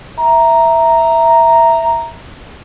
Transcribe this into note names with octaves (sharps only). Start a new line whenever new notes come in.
E5 A#5